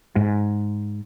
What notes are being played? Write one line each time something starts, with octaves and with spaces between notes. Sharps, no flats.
G#2